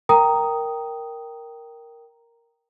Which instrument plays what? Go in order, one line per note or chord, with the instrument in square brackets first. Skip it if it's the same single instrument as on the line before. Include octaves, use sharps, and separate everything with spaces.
[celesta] A#4 G5 A#5 D#6